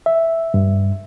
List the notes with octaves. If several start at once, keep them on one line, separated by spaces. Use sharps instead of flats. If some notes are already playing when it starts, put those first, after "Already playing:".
E5
G2